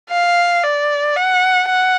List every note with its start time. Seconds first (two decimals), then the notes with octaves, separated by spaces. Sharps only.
0.10 F5
0.64 D5
1.16 F#5
1.68 F#5